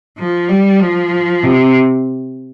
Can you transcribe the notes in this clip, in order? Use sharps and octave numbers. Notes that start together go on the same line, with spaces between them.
F3
G3
F3
C3